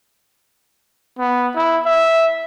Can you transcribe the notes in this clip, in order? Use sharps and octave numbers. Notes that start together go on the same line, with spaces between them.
B3
E4
E5